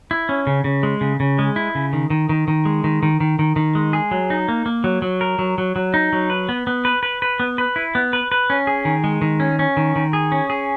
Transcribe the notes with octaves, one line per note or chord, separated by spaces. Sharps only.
E4
C#4
C#3
C#3
G#3
C#3
C#3
G#3
E4
C#3
D#3
D#3
D#3
D#3
G#3
D#3
D#3
D#3
D#3
D#3
G#3
G#4
F#3
D#4
A#3
A#3
F#3
F#3
A#4
F#3
F#3
F#3
D#4
F#3
B4
B3
B3
B4
B4
B4
B3
B4
E4
B3
B4
B4
C#4
G#4
D#3
G#3
D#3
C#4
C#4
D#3
D#3
G#4
C#4
G#4